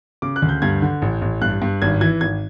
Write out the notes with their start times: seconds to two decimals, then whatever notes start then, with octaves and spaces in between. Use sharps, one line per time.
0.22 C#3 D6
0.36 F#6
0.42 D2
0.49 G6
0.62 G2 G#6
0.82 D3
1.02 A1
1.22 A1
1.42 G2 F#6
1.62 G2
1.82 G#1 G#6
2.01 E3 G#6
2.21 G#1 G#6